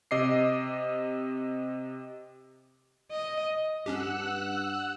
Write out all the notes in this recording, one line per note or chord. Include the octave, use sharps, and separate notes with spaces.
C3 D#5 D6 C7
D#5
G2 C#4 D4 G4 F#5 E6 F#6